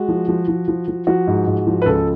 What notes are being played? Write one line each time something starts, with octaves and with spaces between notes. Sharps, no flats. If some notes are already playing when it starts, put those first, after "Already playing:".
Already playing: G#3 F#4
F3
F3
F3
F3
F3
F3 F#4
G#2
G#2
F3
B4
C#2 A4